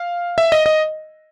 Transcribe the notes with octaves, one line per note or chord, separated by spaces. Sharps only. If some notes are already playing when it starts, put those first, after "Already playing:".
Already playing: F5
E5
D#5
D#5